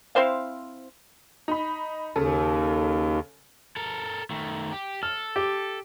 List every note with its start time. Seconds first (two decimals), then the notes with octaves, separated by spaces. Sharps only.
0.15 C4 E4 C5 F5
1.48 D#4 B5
2.16 D#2 C#3 A4
3.76 A4 A#4
4.30 D#3 A3
4.72 G4
5.03 A4 F6
5.36 G4